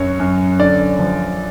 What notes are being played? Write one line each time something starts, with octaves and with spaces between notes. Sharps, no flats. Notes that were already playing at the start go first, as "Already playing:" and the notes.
Already playing: F#2 F#3 C#5
F#2
D3 D5
F3